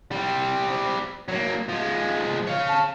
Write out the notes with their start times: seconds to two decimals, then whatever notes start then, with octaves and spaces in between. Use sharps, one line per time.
0.11 G3 C4
1.28 F#3 A#3
1.69 F3 G#3
2.47 C#5 F5
2.68 A5